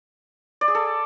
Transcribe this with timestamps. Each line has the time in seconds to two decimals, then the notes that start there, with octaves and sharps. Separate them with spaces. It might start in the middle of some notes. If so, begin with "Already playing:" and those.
0.61 D5
0.68 G#4
0.75 A4